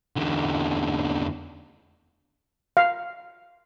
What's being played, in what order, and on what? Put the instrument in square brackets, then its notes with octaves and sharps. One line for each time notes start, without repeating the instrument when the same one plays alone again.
[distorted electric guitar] E2 D3
[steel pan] F5